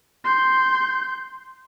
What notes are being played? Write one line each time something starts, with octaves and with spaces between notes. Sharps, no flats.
C6 G6